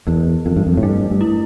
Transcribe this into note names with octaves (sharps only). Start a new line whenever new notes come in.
E2 E3
F2 E3
G2
F2
A2
G2 A3
G2
E4